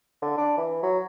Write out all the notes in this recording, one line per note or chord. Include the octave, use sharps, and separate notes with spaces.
D3
D4
E3
F#3